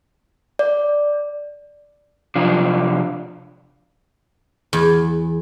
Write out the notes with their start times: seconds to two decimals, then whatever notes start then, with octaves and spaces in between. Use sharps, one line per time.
0.59 D5
2.35 C3 F3 D4 F4
4.73 E2